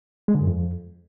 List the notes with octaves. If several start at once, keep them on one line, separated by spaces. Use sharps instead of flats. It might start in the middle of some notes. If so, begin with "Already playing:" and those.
G#3
D3
F#2
F2